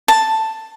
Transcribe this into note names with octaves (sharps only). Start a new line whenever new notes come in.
A5